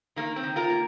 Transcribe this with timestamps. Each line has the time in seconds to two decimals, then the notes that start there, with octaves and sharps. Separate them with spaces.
0.16 D#3 A#3
0.36 C4
0.43 D#3
0.56 F4 A#4
0.70 A#3